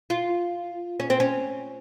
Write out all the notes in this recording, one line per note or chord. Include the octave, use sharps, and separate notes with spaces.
F4
C#4
C4
C#4